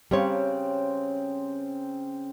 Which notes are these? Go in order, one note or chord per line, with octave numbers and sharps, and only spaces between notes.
C#3 G3 C4 C#5 A#5